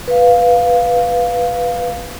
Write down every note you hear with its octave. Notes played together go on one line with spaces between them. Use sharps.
B4 F5